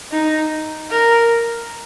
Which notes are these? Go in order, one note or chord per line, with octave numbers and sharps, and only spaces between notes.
D#4
A#4